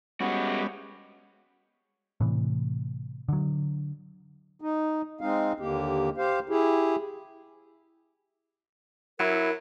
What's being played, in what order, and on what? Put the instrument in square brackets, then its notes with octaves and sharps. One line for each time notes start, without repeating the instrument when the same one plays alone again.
[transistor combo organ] G3 B3 C#4 [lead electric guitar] G#3 F#4
[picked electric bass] A2 C3 E3
D3 F#3
[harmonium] D#4
G#3 C4 D#4 F5
D#2 D3 A#3 G4
G4 C5 F5
E4 G4 G#4
[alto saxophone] F#3 [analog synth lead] E4 [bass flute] A#4